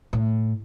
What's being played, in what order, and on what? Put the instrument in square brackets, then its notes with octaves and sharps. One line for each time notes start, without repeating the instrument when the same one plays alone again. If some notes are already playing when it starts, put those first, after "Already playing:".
[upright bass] A2